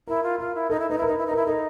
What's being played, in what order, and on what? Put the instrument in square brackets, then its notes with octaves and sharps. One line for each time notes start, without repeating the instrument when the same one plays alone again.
[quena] E4 [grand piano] A#4
[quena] F4
[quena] F4 [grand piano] A#4
[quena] E4
[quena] D#4 [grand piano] A4
[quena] E4
[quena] D#4 [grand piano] B4
[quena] E4 [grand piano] A#4
[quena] D#4 [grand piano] B4
[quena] E4
D#4
[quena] E4 [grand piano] A#4
[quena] D#4 [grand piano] A4